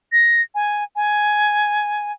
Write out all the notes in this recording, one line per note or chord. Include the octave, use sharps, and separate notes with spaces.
A#6
G#5
G#5